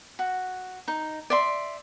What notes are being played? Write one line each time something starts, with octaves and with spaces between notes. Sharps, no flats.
F#4
D#4
D5 E5 C6